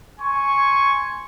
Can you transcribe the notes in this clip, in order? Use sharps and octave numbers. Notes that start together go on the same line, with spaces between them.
G#5 C6 C#6